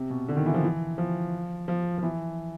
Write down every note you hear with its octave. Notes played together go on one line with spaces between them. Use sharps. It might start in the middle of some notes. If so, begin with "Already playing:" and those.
Already playing: C3
B2
D3
D#3
E3
F3
E3
F3
F3
F3
E3